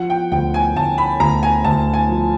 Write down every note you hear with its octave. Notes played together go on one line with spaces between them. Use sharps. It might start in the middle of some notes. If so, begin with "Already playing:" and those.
Already playing: F3 F#5
G5
D2 G5
G#5
D2 A5
B5
D2 A#5
G#5
D2 A5
G#5
F3